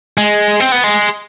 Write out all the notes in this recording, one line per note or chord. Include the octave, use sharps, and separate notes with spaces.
G#3
C4
B3
G#3